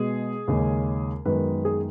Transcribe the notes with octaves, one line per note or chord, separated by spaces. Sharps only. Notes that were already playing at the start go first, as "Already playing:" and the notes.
Already playing: B2 G#3 B3 G#4
D#2 C#3 G#3 C#4
F#2 D#3 G#3 B3 B4
G#4